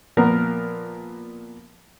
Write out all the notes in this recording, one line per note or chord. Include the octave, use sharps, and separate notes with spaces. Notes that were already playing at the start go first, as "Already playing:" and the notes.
A#2 F3 B3 A#4